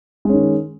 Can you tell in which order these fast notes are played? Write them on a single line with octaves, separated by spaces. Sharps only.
G#3 C#4 D#3